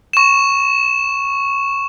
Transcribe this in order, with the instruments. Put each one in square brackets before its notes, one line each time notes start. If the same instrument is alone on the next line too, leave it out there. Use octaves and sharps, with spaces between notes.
[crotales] C#6 E7